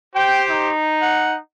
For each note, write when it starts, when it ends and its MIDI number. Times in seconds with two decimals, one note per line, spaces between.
0.15 0.70 67
0.15 0.70 72
0.15 0.44 79
0.50 1.39 63
1.02 1.33 78